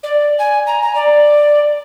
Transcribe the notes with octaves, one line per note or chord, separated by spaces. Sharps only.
D5
G#5
A#5
A#5
D5